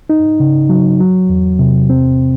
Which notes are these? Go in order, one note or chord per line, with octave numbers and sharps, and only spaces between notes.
D#4
C#3
F#3
F#3
E2
C3
C4